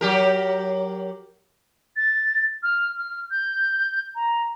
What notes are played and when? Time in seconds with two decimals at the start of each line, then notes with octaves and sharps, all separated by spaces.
0.01 F#3 G4 A#4
1.96 A6
2.63 F6
2.97 F6
3.31 G6
4.15 A#5